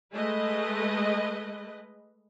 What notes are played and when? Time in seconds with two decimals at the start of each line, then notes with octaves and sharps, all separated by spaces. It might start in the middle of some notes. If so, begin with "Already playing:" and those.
0.12 G#3 A3 B4 D#5